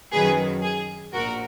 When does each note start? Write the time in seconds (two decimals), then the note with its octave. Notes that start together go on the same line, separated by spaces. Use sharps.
0.12 F#2 D#3 F#3 G#4 B4
0.63 G#4
1.14 A#1 A#2 F#4 A#4